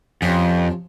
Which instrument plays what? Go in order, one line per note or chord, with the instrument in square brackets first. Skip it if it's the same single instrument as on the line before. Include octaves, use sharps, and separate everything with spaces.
[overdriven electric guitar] F2 [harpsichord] C3 F3 C#4